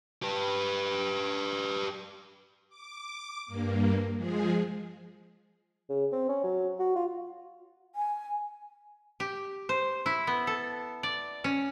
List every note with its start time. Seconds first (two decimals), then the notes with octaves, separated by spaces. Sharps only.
0.22 G4 B4
2.69 D6
3.46 G2 A#3
4.15 F3 G#3 G#4
5.90 C#3
6.12 C4
6.29 C#4
6.44 F#3
6.80 F#4
6.96 F4
7.95 G#5
9.20 G4
9.69 C5
10.06 E4
10.27 B3
10.47 A4
11.03 D5
11.44 C#4